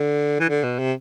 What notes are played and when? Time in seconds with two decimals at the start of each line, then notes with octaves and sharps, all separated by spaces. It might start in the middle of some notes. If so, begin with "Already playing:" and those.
Already playing: D3
0.40 E3
0.49 D3
0.63 B2
0.79 C3